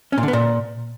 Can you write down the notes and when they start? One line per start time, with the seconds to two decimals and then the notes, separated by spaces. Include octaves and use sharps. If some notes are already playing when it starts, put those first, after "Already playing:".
0.12 C#4
0.18 A#2
0.23 D3
0.28 B3
0.33 A#2